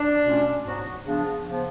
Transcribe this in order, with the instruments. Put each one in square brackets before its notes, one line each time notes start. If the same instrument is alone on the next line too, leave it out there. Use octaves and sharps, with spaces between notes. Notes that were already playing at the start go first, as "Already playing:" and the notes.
Already playing: [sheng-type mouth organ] D4
[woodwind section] B2 A3 C#4 F4
G#2 F#3 B3 F#4
C#3 F3 B3 D4
C#3 F3 B3